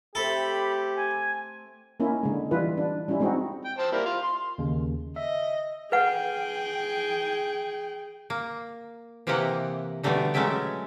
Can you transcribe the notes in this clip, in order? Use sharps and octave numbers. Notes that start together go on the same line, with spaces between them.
A3 C4 G4 A4 B5
G#5
A#3 C#4 D#4 E4
D3 G#3
E3 G3 E4 F4 B4
D4
G3 C#4 D#4 E4
G#3 C4 D#4 E4 F#4
G5
C4 C5 A5
G3 A#3 E4
F4 C6
C6
D#2 C#3
D#5 E5
G#4 B4 F#5 G5
A#3
C3 E3 A#3 G4 D#5 F#5
B2 D3 E3 G3 A3 D#4
F#3 G#3 A3 C#4 E5 G5